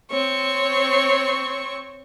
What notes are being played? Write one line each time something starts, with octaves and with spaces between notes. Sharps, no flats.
C4 C#5 C#6